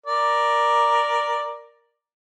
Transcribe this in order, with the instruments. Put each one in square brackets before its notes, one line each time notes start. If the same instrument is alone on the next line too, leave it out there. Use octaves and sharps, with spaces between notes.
[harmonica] A#4 D5